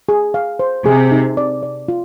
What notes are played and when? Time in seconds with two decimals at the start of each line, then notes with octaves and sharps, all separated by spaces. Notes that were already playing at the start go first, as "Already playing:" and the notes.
0.09 G#4
0.34 F5
0.59 C5
0.86 C3 G#4
1.11 D#4
1.37 D5
1.63 D5
1.88 F4